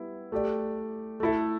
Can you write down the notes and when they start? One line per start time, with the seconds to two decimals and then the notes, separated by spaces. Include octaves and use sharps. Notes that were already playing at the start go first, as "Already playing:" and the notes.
Already playing: G3 B3 E4
0.32 A3 G4 D5
1.20 A3 E4 A4